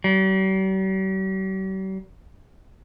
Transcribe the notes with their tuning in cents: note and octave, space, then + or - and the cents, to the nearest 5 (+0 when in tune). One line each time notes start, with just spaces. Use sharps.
G3 -45